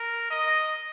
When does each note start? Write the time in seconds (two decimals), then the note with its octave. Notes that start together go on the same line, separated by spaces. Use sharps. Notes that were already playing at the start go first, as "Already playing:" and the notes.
Already playing: A#4
0.30 D#5